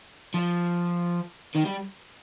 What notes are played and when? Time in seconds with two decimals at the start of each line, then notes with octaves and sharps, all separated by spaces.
0.34 F3
1.55 D#3
1.65 G3